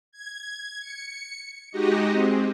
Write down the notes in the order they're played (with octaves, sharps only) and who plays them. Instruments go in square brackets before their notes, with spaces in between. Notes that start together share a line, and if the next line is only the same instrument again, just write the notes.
[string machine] G#6
C#7
G#3 D#4 F#4 G4 D#5
G#3 C4